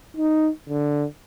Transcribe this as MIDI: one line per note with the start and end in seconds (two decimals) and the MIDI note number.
0.17 0.50 63
0.69 1.06 50